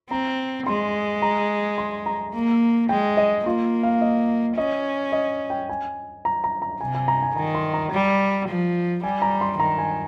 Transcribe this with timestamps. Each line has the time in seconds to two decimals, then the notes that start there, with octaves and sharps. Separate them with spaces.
0.10 C4 A#5
0.67 G#3 C6
1.22 A#5
1.78 C6
2.06 A#5
2.33 A#3
2.89 G#3 G5
3.17 D#5
3.46 A#3 F4
3.83 F5
4.01 D#5
4.57 C#4 D#5
5.12 D#5
5.50 G5
5.69 G#5
6.25 A#5
6.44 A#5
6.62 A#5
6.81 C3 G#5
6.95 G#5
7.08 A#5
7.22 G#5
7.36 D#3 A#5
7.55 C6
7.74 A#5
7.92 G3
8.48 F3
9.04 G3 G#5
9.22 A#5
9.41 C6
9.59 D#3 A#5
9.78 G#5